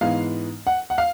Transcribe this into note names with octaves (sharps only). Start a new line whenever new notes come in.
G#2 E3 G#3 B3 F5
F#5
F#5
F5